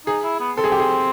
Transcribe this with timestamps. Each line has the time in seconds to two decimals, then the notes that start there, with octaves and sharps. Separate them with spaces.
0.07 D#4 G#4
0.24 E4
0.40 B3
0.57 C4 A4
0.64 G#4
0.72 G4
0.80 G#4